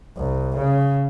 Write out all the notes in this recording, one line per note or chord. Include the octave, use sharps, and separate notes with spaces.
C2
C#3